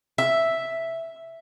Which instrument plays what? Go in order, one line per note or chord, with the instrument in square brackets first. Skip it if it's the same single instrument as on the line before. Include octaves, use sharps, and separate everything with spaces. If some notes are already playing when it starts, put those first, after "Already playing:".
[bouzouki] E5